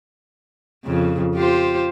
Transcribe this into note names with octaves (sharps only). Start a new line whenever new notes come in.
F2 C#3
F4 G4 C5